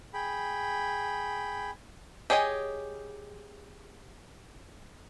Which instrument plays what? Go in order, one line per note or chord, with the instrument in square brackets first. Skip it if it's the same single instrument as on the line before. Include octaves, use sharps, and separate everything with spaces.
[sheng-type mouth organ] G#4 G5 B5
[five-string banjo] G4 G#4 C#5 D#5 G#5